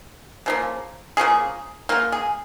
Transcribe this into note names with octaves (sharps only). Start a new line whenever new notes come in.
C#3 F3 A#3
C#3 F3 A#3 G#4
C#3 A#3 F4
G#4